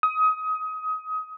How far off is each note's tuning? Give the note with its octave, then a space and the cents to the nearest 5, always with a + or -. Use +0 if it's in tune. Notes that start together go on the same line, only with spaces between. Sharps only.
D#6 +25